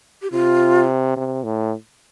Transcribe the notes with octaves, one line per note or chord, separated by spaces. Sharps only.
G4
C3 F4
C3
A2